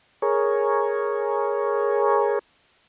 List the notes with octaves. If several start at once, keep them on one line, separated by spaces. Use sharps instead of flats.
G#4 A#4 C#5